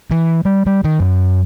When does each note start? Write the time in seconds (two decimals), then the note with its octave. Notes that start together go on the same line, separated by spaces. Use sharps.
0.11 E3
0.45 G3
0.66 G3
0.84 D#3
1.00 F#2